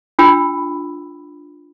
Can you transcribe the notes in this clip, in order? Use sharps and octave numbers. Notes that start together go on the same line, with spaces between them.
D4 F4 G5 B5 E6